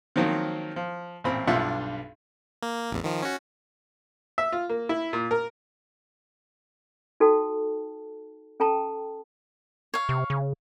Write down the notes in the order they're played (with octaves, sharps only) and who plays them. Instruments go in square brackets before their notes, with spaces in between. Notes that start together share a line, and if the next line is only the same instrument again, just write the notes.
[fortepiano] D#3 F3 F#3 A#3 C4
F3
A1 A#2 C4 B5
B1 G2 D4 F4 E5 F#5
[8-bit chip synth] A#3
A1 E2
D#3 F3
C#4 F#4
[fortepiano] E5
F4
A#3
E4
A#2
A#4
[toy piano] D#4 F#4 A4 G5 A5
C#4 A4 G5 A5 A#5
[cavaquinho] C#5 F5
[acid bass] C3
C#3